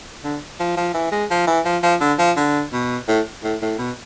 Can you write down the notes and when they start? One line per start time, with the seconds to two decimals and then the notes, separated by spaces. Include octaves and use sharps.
0.24 D3
0.60 F3
0.77 F3
0.94 E3
1.12 G#3
1.31 F3
1.47 E3
1.65 F3
1.83 F3
2.01 D3
2.19 F3
2.36 D3
2.73 B2
3.08 A2
3.43 A2
3.62 A2
3.79 B2